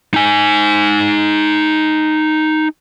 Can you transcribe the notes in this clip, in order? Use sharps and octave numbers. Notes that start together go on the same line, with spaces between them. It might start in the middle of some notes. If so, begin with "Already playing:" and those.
D#4 G#5